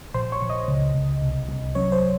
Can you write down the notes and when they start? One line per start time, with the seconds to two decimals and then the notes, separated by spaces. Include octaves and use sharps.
0.14 A#1 C5
0.32 C#5
0.41 A#1
0.50 D#5
0.68 C#2
0.95 C#2
1.22 C2
1.49 C2
1.75 F#2 C#5
1.92 C5